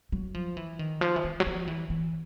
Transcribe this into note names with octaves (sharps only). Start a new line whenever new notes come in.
F#3
F3
E3
D#3
F3
E3
D#3
F#3
F3
E3
E3